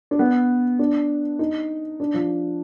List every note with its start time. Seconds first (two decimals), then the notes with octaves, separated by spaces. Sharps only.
0.11 D4
0.19 B3
0.79 D4
1.39 D#4
2.00 D4
2.14 F3